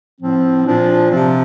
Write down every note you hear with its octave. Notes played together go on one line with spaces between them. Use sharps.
A2 F3 C4
A#2 F3 D4
C3 F3 C4